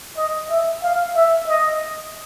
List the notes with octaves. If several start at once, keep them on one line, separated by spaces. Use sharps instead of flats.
D#5
E5
F5
E5
D#5